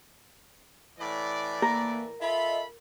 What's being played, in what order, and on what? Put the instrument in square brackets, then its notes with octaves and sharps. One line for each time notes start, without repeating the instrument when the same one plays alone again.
[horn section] A2 E3 D5
[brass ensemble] A#3 [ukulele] A#4
[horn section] F4 A4 B5 [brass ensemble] D#5 E5